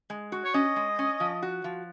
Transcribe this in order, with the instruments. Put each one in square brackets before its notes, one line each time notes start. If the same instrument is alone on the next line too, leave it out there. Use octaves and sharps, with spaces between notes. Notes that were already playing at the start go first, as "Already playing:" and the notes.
[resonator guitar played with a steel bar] G#3
F#4
[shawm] C#5
[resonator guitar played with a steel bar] C#4 [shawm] D#5
[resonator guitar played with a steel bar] G#3
C#4
F3
F#4
F3